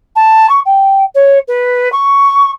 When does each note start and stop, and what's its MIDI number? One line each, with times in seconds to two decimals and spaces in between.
0.16 0.49 81
0.49 0.60 85
0.65 1.04 79
1.15 1.38 73
1.48 1.91 71
1.92 2.51 85